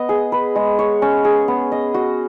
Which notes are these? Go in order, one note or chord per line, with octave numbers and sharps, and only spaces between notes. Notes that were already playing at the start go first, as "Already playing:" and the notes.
Already playing: B3 D#5
G#4
B4
G#3
C#5
C#4
G#4
B3
D#5
F#4